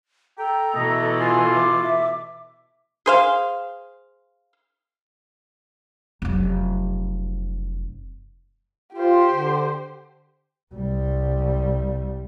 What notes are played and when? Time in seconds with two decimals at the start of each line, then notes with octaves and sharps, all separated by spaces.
0.38 A4 G5 A#5
0.75 B2 E3 A3 D#5
1.20 F4 G#5
1.53 D6
1.83 E5
3.06 G#4 C5 F5
6.22 F1 F#2
8.95 F4 G4 C5
9.31 D3
10.74 C2 G3